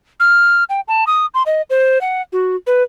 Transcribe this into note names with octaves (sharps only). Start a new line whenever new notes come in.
F6
G5
A5
D#6
C6
D#5
C5
F#5
F#4
B4